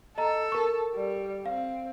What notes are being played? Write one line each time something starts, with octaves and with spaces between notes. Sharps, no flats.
A4 D#5 A#5
A#4 C#6
G3
C4 F5